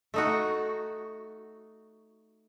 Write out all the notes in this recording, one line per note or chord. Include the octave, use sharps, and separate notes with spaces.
A3 D#4 F#4